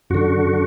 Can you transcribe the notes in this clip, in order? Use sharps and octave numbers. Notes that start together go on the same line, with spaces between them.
F#2 D3 F#4